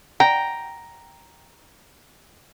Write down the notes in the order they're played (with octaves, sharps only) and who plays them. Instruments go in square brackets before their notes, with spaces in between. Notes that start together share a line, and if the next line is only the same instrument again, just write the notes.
[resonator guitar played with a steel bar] G5 [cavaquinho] A#5